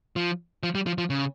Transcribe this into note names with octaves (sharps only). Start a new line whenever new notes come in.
F3
F3
G3
F3
F3
C#3